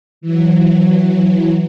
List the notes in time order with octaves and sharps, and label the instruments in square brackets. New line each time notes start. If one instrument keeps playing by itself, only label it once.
[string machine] E3 F#3